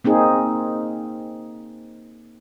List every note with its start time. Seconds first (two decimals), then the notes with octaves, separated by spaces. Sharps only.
0.05 A#3 C4 D#4 G#4